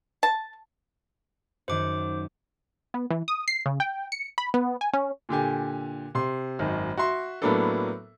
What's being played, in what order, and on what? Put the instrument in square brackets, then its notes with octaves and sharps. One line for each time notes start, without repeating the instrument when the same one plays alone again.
[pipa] A5
[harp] F#2 D#3 [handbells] C5 D6
[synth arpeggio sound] B3
E3
D#6
C7
C#3
G5
C#7
B5
B3
G#5
C#4
[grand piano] A#2 D3 G4 G#5
C3 C6
G#1 F#2 D#3
F#4 E5 C6
A2 F#3 A#3 B3 D4 A4